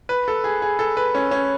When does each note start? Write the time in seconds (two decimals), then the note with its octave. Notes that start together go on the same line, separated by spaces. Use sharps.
0.09 B4
0.28 A4
0.44 G#4
0.62 G#4
0.79 A4
0.97 B4
1.15 C#4
1.31 C#4